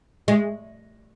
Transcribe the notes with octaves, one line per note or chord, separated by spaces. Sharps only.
G#3